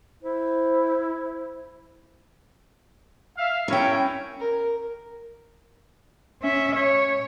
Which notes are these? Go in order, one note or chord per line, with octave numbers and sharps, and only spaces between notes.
E4 C5
E5 F5
C#4 E4 A#4 C#5 G5
A#4
C#4 E5
C#5